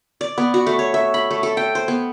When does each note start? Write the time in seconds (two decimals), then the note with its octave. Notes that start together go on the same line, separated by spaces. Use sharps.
0.21 D5
0.38 B3
0.54 F#4
0.67 A3
0.79 C#5
0.94 E5
1.14 B5
1.31 A3
1.43 A4
1.57 G5
1.75 C5
1.88 B3